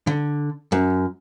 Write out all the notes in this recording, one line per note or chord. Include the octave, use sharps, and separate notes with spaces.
D3
F#2